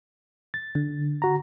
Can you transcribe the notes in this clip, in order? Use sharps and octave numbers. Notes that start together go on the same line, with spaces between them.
A6
D3
F#4 A#5